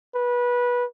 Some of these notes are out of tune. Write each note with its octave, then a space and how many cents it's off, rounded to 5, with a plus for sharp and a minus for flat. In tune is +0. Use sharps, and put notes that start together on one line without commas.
B4 -20